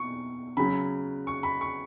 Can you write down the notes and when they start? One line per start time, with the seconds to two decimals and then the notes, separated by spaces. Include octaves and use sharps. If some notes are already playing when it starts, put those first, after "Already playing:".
Already playing: B2 C#6
0.57 C#3 F#3 B5
1.27 C#6
1.43 B5
1.61 C#6